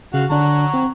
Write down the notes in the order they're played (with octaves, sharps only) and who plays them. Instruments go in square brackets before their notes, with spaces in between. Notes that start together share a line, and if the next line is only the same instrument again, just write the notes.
[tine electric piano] C#3 [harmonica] F#4 F5 F#5
[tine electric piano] D3 D4 [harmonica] F#5 A#5 C#6
[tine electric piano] C4